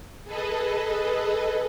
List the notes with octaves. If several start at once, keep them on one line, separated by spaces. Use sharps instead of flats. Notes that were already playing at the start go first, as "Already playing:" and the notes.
G#4 A4 B4 D#5